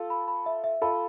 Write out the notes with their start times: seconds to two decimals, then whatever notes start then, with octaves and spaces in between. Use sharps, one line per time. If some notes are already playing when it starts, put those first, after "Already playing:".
Already playing: F4 A4
0.10 B5
0.28 B5
0.46 E5
0.64 E5
0.82 F4 A4 B5